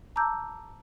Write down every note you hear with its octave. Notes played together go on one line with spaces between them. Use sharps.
A5 A#5 D6 E6 G6